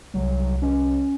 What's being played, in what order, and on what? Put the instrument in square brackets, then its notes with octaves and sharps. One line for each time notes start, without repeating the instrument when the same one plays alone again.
[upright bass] C2 [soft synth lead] F#3
[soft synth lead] C#4